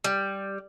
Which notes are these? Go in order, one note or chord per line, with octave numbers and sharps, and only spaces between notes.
G3